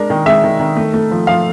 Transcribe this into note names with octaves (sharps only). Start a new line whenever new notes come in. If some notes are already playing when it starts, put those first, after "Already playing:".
Already playing: G#3 D4 A#4
D#3
G#3 E5
D#3
D#3
A3
A3
F3
F3 F5